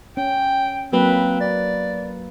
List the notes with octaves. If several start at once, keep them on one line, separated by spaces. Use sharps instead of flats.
C#4 G5
F#3 A#3 C4 B4
D5